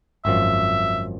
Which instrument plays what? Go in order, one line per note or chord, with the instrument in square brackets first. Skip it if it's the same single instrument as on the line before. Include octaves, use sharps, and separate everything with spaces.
[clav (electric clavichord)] G#1 F#2 F3 [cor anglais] E5